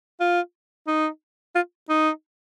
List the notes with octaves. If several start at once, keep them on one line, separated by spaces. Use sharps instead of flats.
F4
D#4
F4
D#4